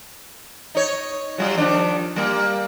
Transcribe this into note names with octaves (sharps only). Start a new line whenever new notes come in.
D#4 C#5
F#3 G3 F4
D#3 F3 D4
G3 A#3